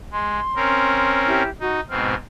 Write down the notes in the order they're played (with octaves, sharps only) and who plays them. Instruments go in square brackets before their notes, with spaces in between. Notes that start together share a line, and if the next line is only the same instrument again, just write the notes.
[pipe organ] G#3 [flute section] C6
[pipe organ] C4 C#4 A#4
[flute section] E4 G4
[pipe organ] D#4 [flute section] F#4
[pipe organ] G#2 B2 C4 [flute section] F6